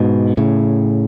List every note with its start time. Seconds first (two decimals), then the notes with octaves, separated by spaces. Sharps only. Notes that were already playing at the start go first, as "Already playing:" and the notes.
Already playing: G#2 B2
0.37 A2 C#3